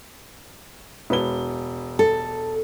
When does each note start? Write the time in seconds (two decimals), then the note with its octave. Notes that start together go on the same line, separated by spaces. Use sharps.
1.10 E1 B4 G7
1.99 A4